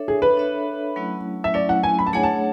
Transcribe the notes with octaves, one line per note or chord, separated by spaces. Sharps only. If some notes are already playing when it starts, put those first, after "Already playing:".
Already playing: D4 A4 C#5 E5
G#4
B4
D4 A4 C#5 E5
F#3 A3 C#4 E4
E5
F#3 A3 C#4 E4 D5
F#5
G#5
B5
A5
A3 D4 G#4 C#5 F#5 G#5
A5